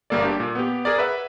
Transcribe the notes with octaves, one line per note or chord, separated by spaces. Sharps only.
G1 G3 A#3 A4 D5
D4 G4
A#2
B3 G4
G#4 A#4 D5
B4 E5 F#5